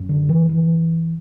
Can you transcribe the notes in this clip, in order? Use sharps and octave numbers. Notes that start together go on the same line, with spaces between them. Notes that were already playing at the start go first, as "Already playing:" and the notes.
Already playing: F#2
D3
E3
E3